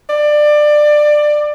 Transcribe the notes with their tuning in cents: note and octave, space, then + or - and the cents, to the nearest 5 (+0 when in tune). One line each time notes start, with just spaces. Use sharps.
D5 +20